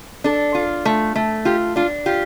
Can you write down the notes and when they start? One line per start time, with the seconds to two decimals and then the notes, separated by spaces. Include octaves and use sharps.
0.24 D4 A4
0.55 F4
0.85 A3
1.15 A3
1.45 F4 G4
1.76 D4 F4
2.06 F4 G4